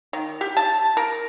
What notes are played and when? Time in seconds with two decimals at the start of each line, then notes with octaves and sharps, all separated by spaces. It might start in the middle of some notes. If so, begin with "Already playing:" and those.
0.13 D#3
0.41 G4
0.57 A5
0.97 A#4